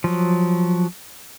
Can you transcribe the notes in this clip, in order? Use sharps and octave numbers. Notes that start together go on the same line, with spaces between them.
F3 F#3